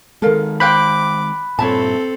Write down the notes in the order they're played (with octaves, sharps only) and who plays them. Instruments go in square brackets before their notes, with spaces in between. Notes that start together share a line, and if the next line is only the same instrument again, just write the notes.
[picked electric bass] D#3 G#3 [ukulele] A4 A#4 F5
[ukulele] C5 F5 G5 [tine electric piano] B5 F#6 [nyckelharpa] D6
[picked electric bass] G2 A#2 [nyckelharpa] C4 A4 [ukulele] C#5 E5 A5